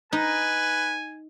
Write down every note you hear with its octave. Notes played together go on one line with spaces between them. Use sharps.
D#4 B4 G#5